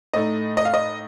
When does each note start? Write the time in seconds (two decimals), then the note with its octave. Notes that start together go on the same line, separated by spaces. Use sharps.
0.13 A2 A3 D#4 D#5
0.57 D#5
0.65 F5
0.74 D#5